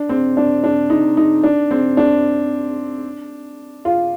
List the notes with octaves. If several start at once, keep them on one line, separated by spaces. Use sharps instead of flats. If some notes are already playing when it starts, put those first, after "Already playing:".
Already playing: D4
C4
D4
D4
D#4
D#4
D4
C4
D4
F4